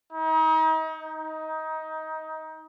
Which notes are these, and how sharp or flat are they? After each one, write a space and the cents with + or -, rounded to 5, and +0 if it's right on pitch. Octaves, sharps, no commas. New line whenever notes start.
D#4 +35
D#4 +20